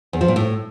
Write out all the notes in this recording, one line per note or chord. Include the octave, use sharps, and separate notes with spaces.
E2
F3
A#2
A2